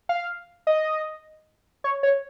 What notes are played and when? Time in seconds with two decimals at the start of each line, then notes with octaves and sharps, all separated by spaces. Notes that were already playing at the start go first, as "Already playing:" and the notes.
0.09 F5
0.67 D#5
1.84 C#5
2.03 C#5